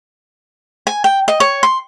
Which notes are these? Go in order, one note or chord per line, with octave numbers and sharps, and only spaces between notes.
G#5
G5
D#5
C#5
C6